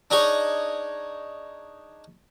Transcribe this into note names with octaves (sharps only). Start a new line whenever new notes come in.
D4 D#4 G#4 C#5